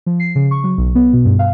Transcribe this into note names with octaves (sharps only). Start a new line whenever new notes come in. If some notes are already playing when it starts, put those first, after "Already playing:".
F3
C7
C#3
C#6
F#3
B1
B3
B2
G2
F5